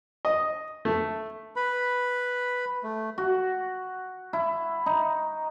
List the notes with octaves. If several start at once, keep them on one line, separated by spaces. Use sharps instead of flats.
D#5
A3
B4 B5
A3
F#4
E4
D#4